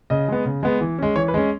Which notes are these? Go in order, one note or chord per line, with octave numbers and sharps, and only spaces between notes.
C#3 D#5
G#3 B3
C#3
G#3 B3
E3
G#3 C#4
E3 C#5
B4
G#3 C#4